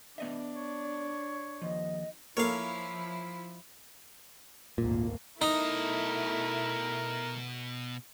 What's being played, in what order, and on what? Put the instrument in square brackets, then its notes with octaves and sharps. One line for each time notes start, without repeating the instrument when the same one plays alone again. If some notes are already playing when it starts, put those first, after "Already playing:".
[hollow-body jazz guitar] B3 D#5 E5 [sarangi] D4
[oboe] C#5
[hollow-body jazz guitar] D#2 F3 [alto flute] D#5
[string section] F3 E4 [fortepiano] A#3 A4 [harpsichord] C#5 F5
[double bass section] G#1 D2 A#3 [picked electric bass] A#2
[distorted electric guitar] B2 A#5 [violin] A3 E4 [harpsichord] D#4 [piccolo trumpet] A#4